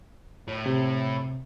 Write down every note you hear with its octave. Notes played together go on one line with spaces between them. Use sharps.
A2
C3